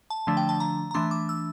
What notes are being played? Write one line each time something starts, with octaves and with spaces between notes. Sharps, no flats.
A5
D3 F3 A3 D4
G5
A5
A#5
A#5
E3 A3 D4 C6
D6
E6